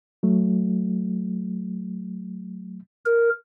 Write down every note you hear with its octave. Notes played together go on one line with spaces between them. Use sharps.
F#3 A3
A#4